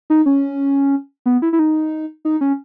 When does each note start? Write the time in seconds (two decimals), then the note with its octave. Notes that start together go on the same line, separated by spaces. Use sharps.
0.10 D#4
0.26 C#4
1.26 B3
1.42 E4
1.53 E4
1.59 D#4
2.25 D#4
2.41 C#4